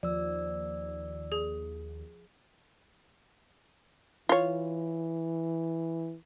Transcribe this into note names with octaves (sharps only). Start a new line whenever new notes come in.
D#2 F3 D5 E6
G#4
E3 F4 C#5